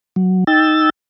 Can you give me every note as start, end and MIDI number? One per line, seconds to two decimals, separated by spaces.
0.16 0.44 54
0.47 0.90 63
0.47 0.90 79
0.47 0.90 88
0.47 0.90 93